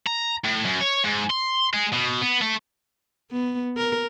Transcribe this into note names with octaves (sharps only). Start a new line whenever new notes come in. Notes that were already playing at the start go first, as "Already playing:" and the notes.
A#5
A2
F#2
C#5
G#2
C6
G#3
B2
B3
A3
B3
A#4